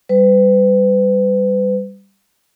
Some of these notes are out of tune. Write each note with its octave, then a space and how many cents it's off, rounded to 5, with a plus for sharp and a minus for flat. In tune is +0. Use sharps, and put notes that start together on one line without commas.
G3 +0 B4 +35